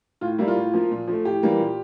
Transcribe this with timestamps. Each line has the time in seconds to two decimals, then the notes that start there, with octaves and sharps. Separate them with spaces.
0.21 A2 F4
0.38 G3 A#3 E4
0.48 F4
0.56 A2
0.73 F3 A#3
0.91 A#2
1.08 F3 A3
1.25 A2 G4
1.43 E3 G3 A#3
1.60 A#2